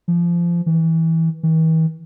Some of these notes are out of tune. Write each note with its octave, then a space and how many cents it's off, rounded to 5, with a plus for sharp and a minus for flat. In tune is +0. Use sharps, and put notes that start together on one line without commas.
F3 -25
E3 -20
E3 -45